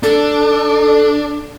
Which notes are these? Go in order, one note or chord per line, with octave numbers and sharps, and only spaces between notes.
D4 A4